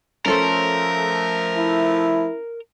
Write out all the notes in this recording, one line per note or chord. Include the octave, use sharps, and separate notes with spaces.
F3 A3 C#4 A4 A#4 C5
E4